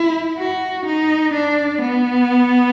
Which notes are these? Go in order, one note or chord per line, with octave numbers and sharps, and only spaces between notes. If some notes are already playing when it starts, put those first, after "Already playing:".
Already playing: E4
F#4
D#4
D4
B3